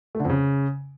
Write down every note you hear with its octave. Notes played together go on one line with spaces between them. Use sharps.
A3
D3
F2
C#3